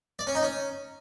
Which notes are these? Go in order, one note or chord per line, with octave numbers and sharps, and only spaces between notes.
D5
C#4
D#4
C#4